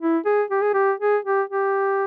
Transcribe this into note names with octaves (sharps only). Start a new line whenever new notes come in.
E4
G#4
G4
G#4
G4
G#4
G4
G4